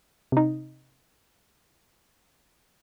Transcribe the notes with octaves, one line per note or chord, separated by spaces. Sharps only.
C3 D#4